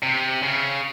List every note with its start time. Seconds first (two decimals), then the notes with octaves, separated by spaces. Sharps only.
0.03 C3
0.43 C#3